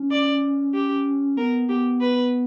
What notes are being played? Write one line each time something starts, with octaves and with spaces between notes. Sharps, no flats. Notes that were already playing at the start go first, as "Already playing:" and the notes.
Already playing: C#4
D5
G4
B3 A#4
B3 G4
B4